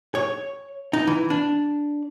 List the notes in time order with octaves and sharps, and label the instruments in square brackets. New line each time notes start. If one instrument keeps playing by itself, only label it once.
[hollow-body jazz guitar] C#5
D#4
E3
D4